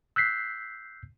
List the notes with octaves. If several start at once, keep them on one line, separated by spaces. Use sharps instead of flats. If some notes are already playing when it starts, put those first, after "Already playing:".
E6 F#6 G6 B6 C7